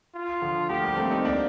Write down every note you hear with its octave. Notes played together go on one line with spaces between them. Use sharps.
F4
D3 F3
F3 A3 G4
G3 A#3
A3 C4
C4 D#4
A#3 D4